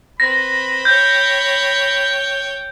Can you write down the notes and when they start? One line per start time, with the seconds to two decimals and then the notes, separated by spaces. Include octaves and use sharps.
0.20 C4 B4 B5 A#6
0.85 C#5 G5 G6